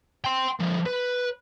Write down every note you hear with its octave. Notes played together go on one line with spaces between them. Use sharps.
G5 C6
D3 F3
B4